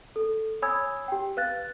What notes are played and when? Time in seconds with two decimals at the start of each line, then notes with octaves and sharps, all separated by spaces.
0.16 A4
0.62 C#5 G#5 B5 D#6 E6 G#6
1.08 G4 G5
1.37 B4 F5 F#6 A6